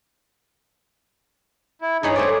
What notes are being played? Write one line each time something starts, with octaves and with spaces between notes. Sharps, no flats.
E4
G2 E3 D#4 G#4 C#5 B5
A3 C4 G#4 C#5 D5